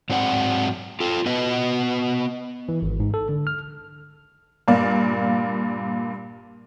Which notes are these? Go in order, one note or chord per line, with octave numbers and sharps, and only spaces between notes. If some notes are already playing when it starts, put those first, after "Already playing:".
G#2 F#3 C4 D5 F#5
F4 A4
B3 F#4 B4 D#5
E3
G#1
G#2
A4
D3
F6
G2 A#2 A#3 D5